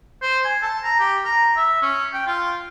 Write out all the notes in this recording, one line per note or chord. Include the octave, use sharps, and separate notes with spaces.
C5
G#5
A5
A#5
G4
A#5
E5
C#4
G5
F4